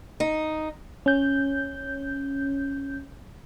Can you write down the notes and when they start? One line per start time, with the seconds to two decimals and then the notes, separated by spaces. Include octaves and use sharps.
0.20 D#4
1.06 C#4 G6